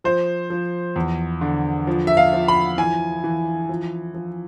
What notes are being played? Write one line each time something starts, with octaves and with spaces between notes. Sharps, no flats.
F3 C5
F3
E2
D3
F3
E5
F5
F3
B5
E3 G#5
E3
F3
F3